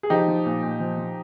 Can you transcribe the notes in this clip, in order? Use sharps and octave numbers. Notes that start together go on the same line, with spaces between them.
G#4
F3 D#4 G4
F3
A#2
A#2
F3
F3